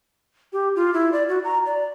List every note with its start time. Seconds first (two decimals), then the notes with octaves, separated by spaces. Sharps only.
0.53 G4
0.76 F4
0.94 E4
1.12 D5
1.29 F#4
1.44 A#5
1.66 D5